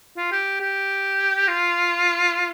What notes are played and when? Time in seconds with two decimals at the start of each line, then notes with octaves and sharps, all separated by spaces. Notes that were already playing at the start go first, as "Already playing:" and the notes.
0.17 F4
0.32 G4
0.60 G4
1.48 F4